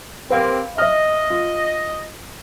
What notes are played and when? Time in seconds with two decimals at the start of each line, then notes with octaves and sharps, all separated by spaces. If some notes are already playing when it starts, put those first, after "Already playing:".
0.30 C3 A#3 C4 B4 F5
0.78 D#5 E5 F6
1.30 F4